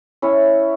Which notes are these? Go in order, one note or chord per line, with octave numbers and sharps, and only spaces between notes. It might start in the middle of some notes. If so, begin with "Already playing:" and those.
C#4 E4 C#5